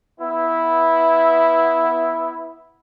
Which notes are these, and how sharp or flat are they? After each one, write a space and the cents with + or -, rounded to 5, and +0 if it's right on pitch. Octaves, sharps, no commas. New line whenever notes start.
B3 +0 E4 -5